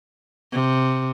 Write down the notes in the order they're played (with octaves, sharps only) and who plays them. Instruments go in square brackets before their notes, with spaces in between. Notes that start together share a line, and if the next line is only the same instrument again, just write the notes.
[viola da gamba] C3